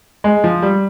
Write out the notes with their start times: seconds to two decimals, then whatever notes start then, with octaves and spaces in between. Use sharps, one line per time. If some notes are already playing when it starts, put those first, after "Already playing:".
0.24 G#3
0.44 F3
0.63 G3